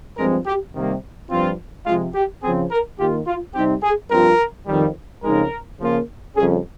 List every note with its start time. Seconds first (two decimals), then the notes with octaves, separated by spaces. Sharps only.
0.18 G2 F3 G#3 C4 A#4
0.46 G4
0.74 C3 D#3 G3 A#3
1.31 G2 F3 C4 F4
1.86 C3 F3 G#3 F4
2.14 G4
2.43 C#3 F3 C4 G#4
2.71 A#4
2.99 D#3 A#3 F4 G4
3.27 F4
3.55 C3 G3 C4 D#4 G4
3.83 G#4
4.11 G2 F3 C4 F4 A#4
4.67 F2 D#3 G3
5.23 F2 C#3 G#3 D#4 A#4
5.80 C#3 F3 A#3 F4
6.36 F2 C#3 G3 C#4 G#4